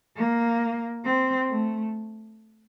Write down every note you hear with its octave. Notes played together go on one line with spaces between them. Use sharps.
A#3
C4
A3